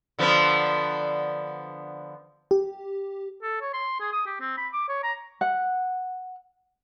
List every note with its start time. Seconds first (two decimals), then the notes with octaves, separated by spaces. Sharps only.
0.19 D3 F3 B3
2.51 G4
3.43 A4
3.61 C#5
3.74 C6
4.00 G#4
4.13 D#6
4.26 G4
4.41 C4
4.58 B5
4.73 D6
4.89 C#5
5.04 A#5
5.41 F#5